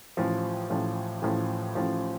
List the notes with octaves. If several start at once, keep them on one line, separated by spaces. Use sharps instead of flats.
A1 A2 F3
A1 A2 F3
A1 A2 F3
A1 A2 F3